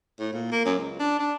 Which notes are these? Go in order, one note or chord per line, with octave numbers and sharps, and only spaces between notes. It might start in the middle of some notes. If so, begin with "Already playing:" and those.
A2
A#2
A#3
F#2
C#2
D4
D4